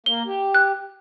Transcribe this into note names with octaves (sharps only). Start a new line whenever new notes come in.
A#3 G7
G4
F#6